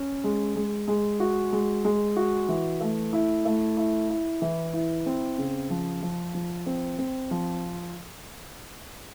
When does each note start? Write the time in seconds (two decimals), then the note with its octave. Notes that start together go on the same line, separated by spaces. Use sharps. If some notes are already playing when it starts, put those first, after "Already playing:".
Already playing: C#4
0.24 G#3
0.56 G#3
0.88 G#3
1.20 F#4
1.52 G#3
1.85 G#3
2.16 F#4
2.48 E3
2.81 A3
3.13 E4
3.45 A3
3.77 E4
4.10 E4
4.42 E3
4.73 E4
5.06 C4
5.38 C#3
5.70 F3
6.02 F3
6.35 F3
6.66 C4
6.98 C4
7.31 F3